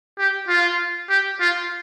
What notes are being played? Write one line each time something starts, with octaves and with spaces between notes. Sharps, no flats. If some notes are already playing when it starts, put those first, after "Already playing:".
G4
F4
G4
F4